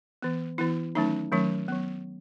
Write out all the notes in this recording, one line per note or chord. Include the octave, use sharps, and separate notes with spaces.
E3 B3
E3 B3 E4
D#3 F#3 A3 C#4 D#4
D#3 F#3 A3 C#4
F#3 B3